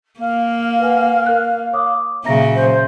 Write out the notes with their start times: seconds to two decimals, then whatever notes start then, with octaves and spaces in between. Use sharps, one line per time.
0.20 A#3 F5
0.80 B4 F#5 G#5
1.26 A#4 F#6
1.73 C#5 D6 D#6
2.25 A#2 C#3 F#3 E5 A#5 A#6
2.55 C5